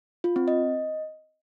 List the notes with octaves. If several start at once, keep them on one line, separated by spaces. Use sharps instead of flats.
F4
C4
D#5